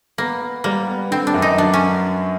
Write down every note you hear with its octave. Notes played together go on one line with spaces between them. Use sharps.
A#3 B3
B3
G3 A#3
B3
D3 C4
D4
F#2
D#4
F#3 D4
C#4